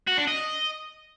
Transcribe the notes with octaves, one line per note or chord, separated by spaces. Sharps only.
F#4
D4
D#5